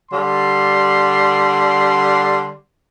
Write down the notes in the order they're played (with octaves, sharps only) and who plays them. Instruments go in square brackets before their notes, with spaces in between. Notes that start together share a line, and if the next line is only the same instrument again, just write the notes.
[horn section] D3 G3 C6